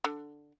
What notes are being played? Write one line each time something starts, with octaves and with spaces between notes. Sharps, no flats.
D3